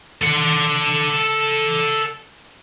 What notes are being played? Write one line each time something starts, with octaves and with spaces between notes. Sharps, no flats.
A4 F#5